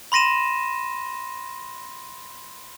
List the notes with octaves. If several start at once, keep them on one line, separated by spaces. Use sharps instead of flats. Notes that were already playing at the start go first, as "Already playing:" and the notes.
B5 C6 A#6 D#7 E7